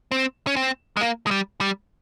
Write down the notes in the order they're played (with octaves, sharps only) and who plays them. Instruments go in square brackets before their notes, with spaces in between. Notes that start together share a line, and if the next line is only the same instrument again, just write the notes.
[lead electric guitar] C4
C#4
C4
G#3
A#3
G#3
G3
G3